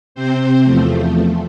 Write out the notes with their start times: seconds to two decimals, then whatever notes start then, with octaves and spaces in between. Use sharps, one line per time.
0.15 C3 C4 C5
0.64 E2 F3 A3